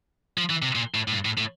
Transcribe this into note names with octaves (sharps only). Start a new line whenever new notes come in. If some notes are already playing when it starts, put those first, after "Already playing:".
F3
E3
C3
A#2
A2
A2
G2
A2
A2